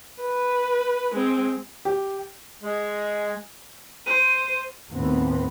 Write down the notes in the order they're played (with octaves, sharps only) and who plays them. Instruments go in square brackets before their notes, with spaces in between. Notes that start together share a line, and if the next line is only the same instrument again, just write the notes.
[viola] B4
G#3 C4
[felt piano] G4
[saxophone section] G#3
[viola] C5 [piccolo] D#7
[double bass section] D#2 A2 B3 C4